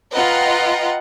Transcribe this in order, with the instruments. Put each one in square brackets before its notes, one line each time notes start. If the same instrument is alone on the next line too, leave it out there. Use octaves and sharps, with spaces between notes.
[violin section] F4 B4 D#5 F#5 G5 A#5